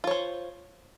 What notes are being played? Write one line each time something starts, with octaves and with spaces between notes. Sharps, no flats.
F4 C5 C#5